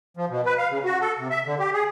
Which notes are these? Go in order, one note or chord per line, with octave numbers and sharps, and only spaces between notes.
F3
B2
B4
F5
C#3
F#4
A4
C3
E5
D3
G4
G#4